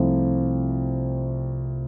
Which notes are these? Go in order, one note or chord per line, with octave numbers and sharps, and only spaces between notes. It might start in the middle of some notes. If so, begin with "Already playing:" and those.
Already playing: C2 C3 F3 A3